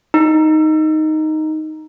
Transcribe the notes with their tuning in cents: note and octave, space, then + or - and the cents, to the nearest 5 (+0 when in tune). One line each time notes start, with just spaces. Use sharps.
D#4 +0